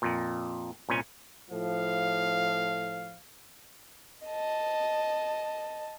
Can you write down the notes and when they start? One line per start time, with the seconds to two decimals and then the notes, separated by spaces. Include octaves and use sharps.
0.02 F2 A#2
0.89 C2 A#2 C#4 G#5
1.51 A2 F3 F5
4.27 D#5 A5